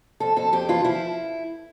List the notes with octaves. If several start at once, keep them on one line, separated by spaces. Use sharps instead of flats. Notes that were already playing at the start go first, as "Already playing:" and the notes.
F2 A4
F2 A4
F2 G4
E3 F4
F3 E4